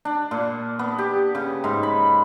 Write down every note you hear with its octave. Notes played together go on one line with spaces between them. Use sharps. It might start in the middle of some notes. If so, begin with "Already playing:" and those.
D4
A#2
B3
G4
C#3
G#2
B5